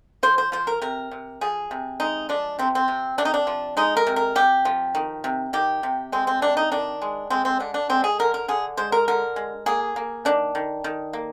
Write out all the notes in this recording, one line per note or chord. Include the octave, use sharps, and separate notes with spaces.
F3 C5
C5
F3 C5
A#4
C3 A#4
C3
F3 G#4
C3
G#3 D#4
F3 D4
C3 C4
C4
C3
C3 D4
D#4
D4
F3
G#3 D#4
A#4
C3
A#4
C3 G4
F3
D#3
C3
D#3 G4
C3
G#3 C4
C4
C3 D4
D#4
D#3 D4
G#3
G#3 C4
C4
D3 D4
D4
G#3 C4
G#4
D3 A#4
A#4
D3 G#4
G#3 C5
A#4
D3 A#4
G#3
A#3 G#4
A#3
D#3 D4
D#3
D#3
A#3